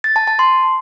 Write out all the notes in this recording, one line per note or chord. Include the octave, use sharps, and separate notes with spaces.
A6
A5
A5
C6